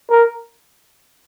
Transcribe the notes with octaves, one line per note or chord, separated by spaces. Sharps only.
A#4